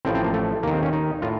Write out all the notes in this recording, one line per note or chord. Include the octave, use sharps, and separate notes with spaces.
A1 A2 F3 C4
C4
A#3
A3
D#2 D#3 A#3
C4
C#4
D#4
A2 F4